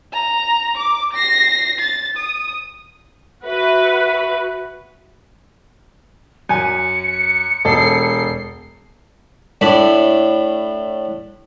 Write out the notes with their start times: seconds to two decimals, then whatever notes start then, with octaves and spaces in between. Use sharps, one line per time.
0.13 A#5
0.77 D6
1.13 A#6 C7
1.79 A6
2.17 D#6
3.45 F#4 B4 E5
6.49 F#2 G#5 C#7
7.65 E1 A4 C7
9.61 A2 D4 B5